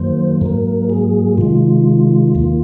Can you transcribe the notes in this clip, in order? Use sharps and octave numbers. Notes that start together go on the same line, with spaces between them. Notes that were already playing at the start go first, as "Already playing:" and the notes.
Already playing: F#2 D#3 F#3 A#3 C5
G#2 F#3 A#3 A#4
G#4
C3 D#3 G#3 F4
D#2 D#3 A#3